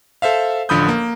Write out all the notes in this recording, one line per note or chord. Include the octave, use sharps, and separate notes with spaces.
A4 C5 E5 F5
A1 D3 F3 B5 D#6 G6
A#3